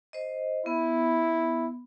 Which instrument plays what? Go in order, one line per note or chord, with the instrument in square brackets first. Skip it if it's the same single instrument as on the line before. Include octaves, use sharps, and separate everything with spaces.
[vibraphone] C5 D#5
[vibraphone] B3 [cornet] E4